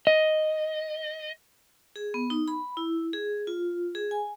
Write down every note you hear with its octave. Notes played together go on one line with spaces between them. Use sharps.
D#5
G#4
B3
D#4
B5
E4
G#4
F4
G#4
G#5